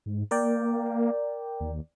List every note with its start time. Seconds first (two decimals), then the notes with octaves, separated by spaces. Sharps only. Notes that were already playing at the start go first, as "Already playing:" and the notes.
0.06 G#2
0.31 A#3 A#4 D5 G5
1.60 D#2